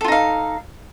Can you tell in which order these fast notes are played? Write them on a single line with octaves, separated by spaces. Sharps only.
A4 F4 D#4 F5